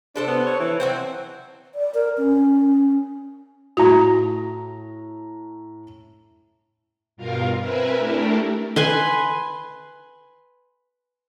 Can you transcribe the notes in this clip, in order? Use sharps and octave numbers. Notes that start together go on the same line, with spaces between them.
C3 D4 A4 C5
B3
C#5
E3
F#3 C4 F#4 C5
D5
A#4
C#4
A2 F#4 A#5
G2 B2 F4 A#4 F5
C4 A#4 B4 E5 G#5
A3 D4 E4 G4 A#4
B4 G#5 C6